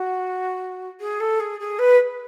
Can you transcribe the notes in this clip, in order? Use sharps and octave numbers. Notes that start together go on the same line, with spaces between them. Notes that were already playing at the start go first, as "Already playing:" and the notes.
Already playing: F#4
G#4
A4
G#4
G#4
B4